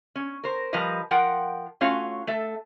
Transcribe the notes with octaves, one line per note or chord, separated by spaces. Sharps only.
C#4
A#4 C5
F3 G3 A#4 B4 D#5
F3 F4 A#4 F#5 G5
A3 C#4 F4 F#4 C#5 F5
A3 A4 E5